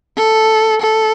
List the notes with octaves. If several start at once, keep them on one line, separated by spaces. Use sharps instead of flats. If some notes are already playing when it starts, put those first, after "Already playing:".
A4
A4